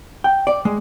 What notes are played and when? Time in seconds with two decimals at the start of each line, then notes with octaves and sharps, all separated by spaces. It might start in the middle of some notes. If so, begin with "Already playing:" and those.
0.24 G5
0.47 D5
0.65 G#3